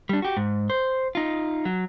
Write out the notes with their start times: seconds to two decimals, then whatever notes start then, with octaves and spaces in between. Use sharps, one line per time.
0.09 G3 D4
0.22 F#4 G4
0.37 G#2
0.70 C5
1.15 D#4 F4
1.65 F#3